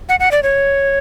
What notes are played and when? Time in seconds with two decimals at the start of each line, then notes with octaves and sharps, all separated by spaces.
0.09 F#5
0.20 F#5
0.31 D5
0.43 C#5